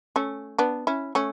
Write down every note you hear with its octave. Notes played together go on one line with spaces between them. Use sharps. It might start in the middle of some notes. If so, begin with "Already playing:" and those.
A3 C#4
B3 D4
C#4 E4
A3 C#4